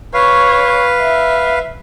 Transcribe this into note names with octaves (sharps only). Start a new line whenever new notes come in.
B4 C#5 F5
E5